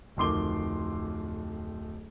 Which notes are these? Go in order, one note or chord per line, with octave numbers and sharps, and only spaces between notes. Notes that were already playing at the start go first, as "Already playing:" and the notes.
D1 F2 D#3 C6 D6 G7